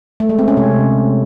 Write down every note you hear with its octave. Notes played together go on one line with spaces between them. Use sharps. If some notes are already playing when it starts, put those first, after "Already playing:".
A3
G#3
C4
C#4
C3